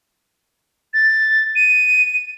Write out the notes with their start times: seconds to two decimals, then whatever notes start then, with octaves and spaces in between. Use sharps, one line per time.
0.94 A6
1.56 D#7